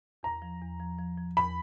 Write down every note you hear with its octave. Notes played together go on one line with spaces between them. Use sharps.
E2 A#5
F3
E2
F3
F3
F3
E2 B5